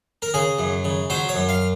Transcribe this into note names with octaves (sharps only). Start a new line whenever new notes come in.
A#4
C#3 G#4
F#2
C#3
F#3 C5
C#5
F#2
F5